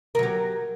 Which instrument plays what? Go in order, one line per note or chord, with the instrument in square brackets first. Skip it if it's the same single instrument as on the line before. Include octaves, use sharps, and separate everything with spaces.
[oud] A#4
F#3
G4